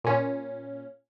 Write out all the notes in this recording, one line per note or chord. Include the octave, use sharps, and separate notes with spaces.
A#2 C#4